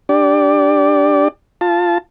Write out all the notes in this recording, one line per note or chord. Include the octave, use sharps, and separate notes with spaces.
D4 G4 D5
F4 A5